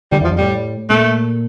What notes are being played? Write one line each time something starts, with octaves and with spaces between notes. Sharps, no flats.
D3 G3
E2
F3
F2
A2 G3
A#2 A3